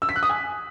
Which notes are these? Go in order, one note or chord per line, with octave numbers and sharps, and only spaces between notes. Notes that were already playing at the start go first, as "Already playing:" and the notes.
E6
B6
F#6
D#6
G#5